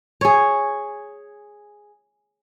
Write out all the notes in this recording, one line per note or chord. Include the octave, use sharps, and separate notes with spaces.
G#4 C#5